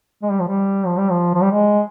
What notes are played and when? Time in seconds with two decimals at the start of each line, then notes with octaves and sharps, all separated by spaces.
0.23 G#3
0.31 G3
0.40 F3
0.48 G3
0.86 F3
0.98 G3
1.10 F3
1.35 F3
1.42 G3
1.51 G#3